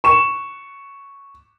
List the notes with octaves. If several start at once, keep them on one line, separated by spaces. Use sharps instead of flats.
C#6 E7